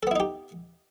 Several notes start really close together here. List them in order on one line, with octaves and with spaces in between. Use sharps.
A4 B3 E4 D#4 G4